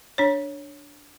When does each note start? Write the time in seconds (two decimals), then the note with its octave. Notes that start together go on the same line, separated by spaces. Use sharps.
0.18 D4 C#5